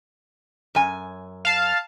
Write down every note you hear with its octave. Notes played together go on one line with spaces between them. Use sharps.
F#2 G#5
F5 A5